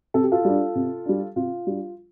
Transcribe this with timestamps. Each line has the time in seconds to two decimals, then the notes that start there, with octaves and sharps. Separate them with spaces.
0.14 C3 A4
0.23 G4
0.32 F4 A4
0.45 G3 D4
0.75 C3
1.06 G3 D4
1.36 C3 F4
1.67 G3 D4